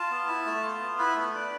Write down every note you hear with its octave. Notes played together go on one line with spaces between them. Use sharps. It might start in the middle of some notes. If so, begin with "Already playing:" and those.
Already playing: F4 A5
B3
E4
A3
F4
B3
E4 B4
A3
D4